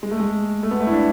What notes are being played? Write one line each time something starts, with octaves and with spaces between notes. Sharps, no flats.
G#3
A3
G#3
A3
B3
A3
E4
D4